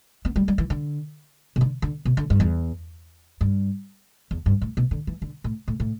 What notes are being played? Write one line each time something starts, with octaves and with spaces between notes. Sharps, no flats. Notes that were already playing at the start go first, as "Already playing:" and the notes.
B3
G3
G3
E3
D3
B2
D3
D3
B2
D3
G2
E2
G2
E2
G2
A2
B2
D3
E3
D3
A2
A2
A2